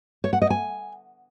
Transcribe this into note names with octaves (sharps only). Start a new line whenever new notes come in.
C#5
F#5
D#5
G#5